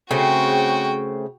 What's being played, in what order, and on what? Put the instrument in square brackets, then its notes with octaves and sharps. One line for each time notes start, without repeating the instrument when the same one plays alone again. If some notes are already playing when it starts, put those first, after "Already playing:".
[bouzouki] C#3 A3 C4 [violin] F#4 G5